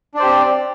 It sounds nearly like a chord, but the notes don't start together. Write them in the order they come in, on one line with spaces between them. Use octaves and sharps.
D4 D5 C5 G4 C4